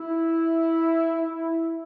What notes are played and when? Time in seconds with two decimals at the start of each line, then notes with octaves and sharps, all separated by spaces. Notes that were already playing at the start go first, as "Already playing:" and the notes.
Already playing: E4
1.21 E4